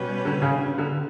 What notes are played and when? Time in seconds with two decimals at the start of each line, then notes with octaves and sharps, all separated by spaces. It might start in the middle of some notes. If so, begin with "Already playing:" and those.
Already playing: B2 G3 C#4 G4 B4
0.25 D3
0.42 C#3
0.78 D3